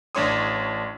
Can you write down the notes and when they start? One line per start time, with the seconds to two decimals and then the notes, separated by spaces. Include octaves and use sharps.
0.15 A1 D4 C#5 C6 D#6